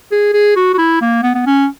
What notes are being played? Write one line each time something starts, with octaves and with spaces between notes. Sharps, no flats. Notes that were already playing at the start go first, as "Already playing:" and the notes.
G#4
G#4
F#4
F#4
E4
A#3
B3
B3
C#4